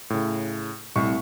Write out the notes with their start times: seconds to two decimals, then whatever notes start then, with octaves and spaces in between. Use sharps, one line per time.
0.10 A2 C#3
0.96 C2 A2 C#6